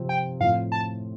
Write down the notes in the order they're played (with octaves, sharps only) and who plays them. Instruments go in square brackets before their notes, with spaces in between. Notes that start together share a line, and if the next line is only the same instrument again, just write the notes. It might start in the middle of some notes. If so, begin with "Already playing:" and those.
Already playing: [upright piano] C3 F3 C4
[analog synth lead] G5
[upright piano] A2 F3 C4 F4 [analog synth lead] F5
[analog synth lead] A5